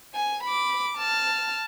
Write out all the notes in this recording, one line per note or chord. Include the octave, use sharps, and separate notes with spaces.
G#5
B5 D6
A5 F6